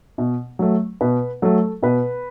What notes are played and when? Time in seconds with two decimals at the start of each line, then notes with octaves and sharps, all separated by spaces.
0.18 B2
0.59 F#3 A3
1.01 B2 B4
1.42 F#3 A3 A4
1.83 B2 B4